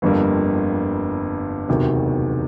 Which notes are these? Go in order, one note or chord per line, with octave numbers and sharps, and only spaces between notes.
G1 F2 D3 G3 A#3
E1 D2 C3 D#3 F#3